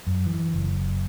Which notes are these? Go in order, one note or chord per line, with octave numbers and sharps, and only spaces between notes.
F#2
E3
F#1